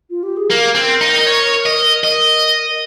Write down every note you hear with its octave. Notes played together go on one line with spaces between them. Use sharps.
F4
G4
G#4
A#3 A#4
C4
D#4
D#5
C#5
D#5
D#5